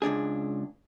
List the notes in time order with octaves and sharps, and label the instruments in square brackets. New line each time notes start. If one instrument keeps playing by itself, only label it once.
[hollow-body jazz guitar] C#2 F#2 D4 G#4